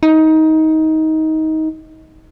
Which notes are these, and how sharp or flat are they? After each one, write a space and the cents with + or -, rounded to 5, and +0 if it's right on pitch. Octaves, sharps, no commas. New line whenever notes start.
D#4 +20